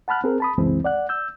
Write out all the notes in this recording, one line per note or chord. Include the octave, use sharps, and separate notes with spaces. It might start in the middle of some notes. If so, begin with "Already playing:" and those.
F#5 A5 B5 F6 F#6
C4 G#4 A#4
A5 B5 D#6
C2 F#2 C#3 E3 G#3 C4
D5 F#5 F#6
E6 G6